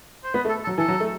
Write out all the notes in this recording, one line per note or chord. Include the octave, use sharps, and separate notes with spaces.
C5
B3 B4
A3
A4
A4
F#3
E3 A4
F#3
A3